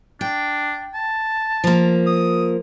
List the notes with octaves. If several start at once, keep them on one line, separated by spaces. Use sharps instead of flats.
D4 G5
A5
F3 A#3
D#6